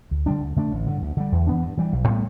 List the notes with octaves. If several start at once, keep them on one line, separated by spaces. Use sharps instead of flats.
D2
D3 G3 D4
D2
D3 A3 D4
A1
G2 D3
D2
D3 G3
E2
E3 B3 D4
G2
E3 G3
B1
A2 G3 B3